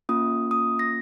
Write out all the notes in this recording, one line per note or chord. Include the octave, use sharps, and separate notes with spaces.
A#3 C#4 F4 D#6
D#6
A#6